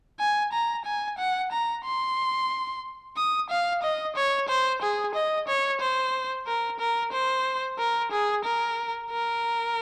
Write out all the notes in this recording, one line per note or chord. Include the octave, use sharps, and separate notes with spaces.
G#5
A#5
G#5
F#5
A#5
C6
D#6
F5
D#5
C#5
C5
G#4
D#5
C#5
C5
A#4
A#4
C5
A#4
G#4
A#4
A#4